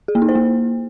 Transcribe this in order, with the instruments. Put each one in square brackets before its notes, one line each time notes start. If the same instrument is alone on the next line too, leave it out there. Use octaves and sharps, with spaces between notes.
[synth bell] G#4
A#3
D#4
C5
A#3